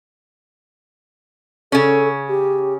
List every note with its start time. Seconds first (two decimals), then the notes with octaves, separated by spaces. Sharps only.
1.72 C#3 C#4 A4
2.29 G4